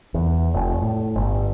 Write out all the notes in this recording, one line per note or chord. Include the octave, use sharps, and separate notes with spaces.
E2
F1
A2
G1